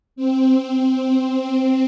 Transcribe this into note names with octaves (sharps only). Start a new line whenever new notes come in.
C4